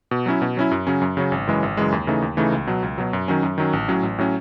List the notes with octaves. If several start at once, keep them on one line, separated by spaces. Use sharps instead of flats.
B2
F#3 C#4 E4
B2
F#3 C#4 E4
F#2
C#3 F#3 C#4
F#2
C#3 F#3 C#4
G#1
F#2 C#3 E3 G#3
G#1
F#2 C#3 E3 G#3
D#2
C#3 E3 A3 D#4
D#2
C#3 E3 A3 D#4
C#2
B2 F#3
C#2
B2 F#3
F#2
D#3 F#3 C#4
F#2
D#3 F#3 C#4
A1
A2 F#3 C#4
A1
A2 F#3 C#4